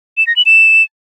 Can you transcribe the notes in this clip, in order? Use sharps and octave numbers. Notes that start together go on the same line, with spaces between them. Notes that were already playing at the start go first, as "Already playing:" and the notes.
E7
A#6
F#7
E7